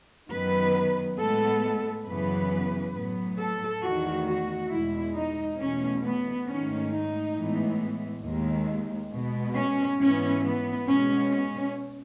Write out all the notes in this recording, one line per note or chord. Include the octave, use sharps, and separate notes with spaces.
F#2 D#3 F#3 B3 B4
A2 G#3 B3 A4
F#2 C#3 E3 B3 B4
A2 F#3 B3
A4
E2 D#3 A3 F#4
F#4
E2 B2 G#3 E4
D#4
E2 B2 A3 C#4
B3
G#2 D#3 A3 C#4
D#4
A2 E3 G#3 B3
D#2 D#3 G#3
B2 G#3 B3
C#4
G#2 E3 B3 C#4
B3
B2 G#3 B3 C#4
C#4